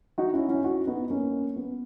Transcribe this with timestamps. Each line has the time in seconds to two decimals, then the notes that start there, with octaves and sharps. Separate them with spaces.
0.18 D#4 F#4
0.34 C#4 E4
0.49 C#4 E4
0.64 D#4 F#4
0.87 B3 D#4
1.10 A#3 C#4
1.56 B3